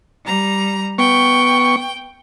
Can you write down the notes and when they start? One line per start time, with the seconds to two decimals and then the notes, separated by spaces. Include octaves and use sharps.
0.25 G3 A#5
0.98 B3 G5 C#6